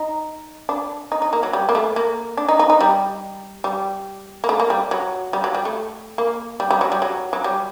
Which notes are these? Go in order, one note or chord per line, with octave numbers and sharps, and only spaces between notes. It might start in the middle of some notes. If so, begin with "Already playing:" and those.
Already playing: D#4
D4
D#4
D#4
A#3
F#3
G3
A#3
A3
A#3
D4
D#4
D#4
D#4
G3
G3
A#3
A3
A#3
G3
F#3
G3
F#3
G3
A3
A#3
G3
G3
F#3
G3
F#3
F#3
G3